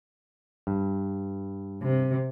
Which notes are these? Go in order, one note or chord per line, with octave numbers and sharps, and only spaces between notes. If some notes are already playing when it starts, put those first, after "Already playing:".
G2
C3